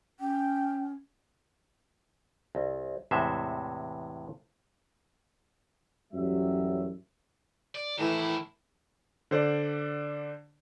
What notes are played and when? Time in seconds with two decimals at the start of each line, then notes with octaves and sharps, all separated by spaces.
0.20 C#4 G5
2.55 C2
3.11 E2 A2 C3 G#3 C5 E5
6.12 A1 F#2 F#3 G3 G4 E5
7.75 D5
7.98 A2 D#3 E3 E4
9.31 D3 C5 D5